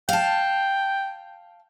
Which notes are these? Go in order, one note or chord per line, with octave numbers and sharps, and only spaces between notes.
F5 G5 A5